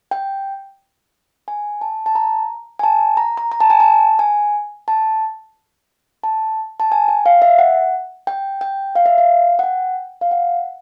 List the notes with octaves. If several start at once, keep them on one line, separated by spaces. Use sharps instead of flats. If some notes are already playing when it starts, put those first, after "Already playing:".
G5
G#5
A5
A5
A#5
G#5
A5
A#5
A#5
A#5
A5
G#5
A5
G#5
A5
A5
A5
G#5
G5
F5
E5
F#5
G5
G5
F5
E5
F5
F#5
G5
F5
F#5